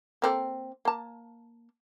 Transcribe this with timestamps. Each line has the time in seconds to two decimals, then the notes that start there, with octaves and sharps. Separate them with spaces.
0.22 A#3 C4 A4
0.85 A#3 A5